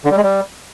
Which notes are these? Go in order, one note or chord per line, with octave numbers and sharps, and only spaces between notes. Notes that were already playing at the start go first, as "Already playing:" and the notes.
D3
G3
G#3
G3